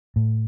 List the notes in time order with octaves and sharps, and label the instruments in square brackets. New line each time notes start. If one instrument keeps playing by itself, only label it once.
[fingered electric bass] A2